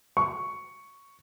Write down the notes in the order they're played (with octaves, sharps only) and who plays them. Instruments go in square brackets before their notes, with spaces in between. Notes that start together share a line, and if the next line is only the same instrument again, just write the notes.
[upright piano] C#6